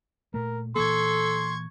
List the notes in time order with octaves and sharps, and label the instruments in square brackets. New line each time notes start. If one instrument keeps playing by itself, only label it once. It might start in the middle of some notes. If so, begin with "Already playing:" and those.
[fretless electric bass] A#2 A3 [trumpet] A#4
[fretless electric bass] A#2 E3 A#3 [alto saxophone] A4 [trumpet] C6 [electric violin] C#6 G#6